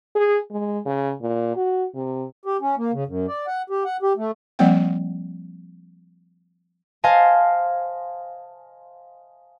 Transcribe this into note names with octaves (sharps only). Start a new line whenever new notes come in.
G#4
G#3
C#3
A#2
F#4
C3
G4
C#4
A#3
C#3
F#2
D5
F#5
G4
F#5
G4
A3
F3 G3 A#3 C4 F#5 G5
C5 D#5 F5 G#5 A5